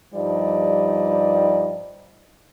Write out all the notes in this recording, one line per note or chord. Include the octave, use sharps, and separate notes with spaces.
G2 F3 G3 D#4 D5 D#5